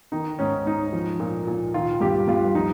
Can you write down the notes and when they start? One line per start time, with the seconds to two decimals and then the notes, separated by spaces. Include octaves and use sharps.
0.12 D#3 D#4
0.39 G#2 C#4
0.66 G#2 D#4
0.93 F3
1.20 A#2
1.47 A#2
1.74 D#3 F4
2.01 G2 G4
2.28 G2 F4
2.55 F3 D#4